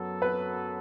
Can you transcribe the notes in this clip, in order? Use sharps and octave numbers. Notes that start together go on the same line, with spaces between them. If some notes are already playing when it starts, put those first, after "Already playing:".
Already playing: F#2 F#3 B3 A4
B4